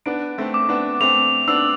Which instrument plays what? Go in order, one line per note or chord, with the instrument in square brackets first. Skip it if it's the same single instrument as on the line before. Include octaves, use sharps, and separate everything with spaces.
[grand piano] B3 D4 [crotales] D7
[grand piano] A3 C4
[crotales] D6
[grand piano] B3 D4
[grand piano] A3 C4 [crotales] F7
[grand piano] B3 D4 [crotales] E6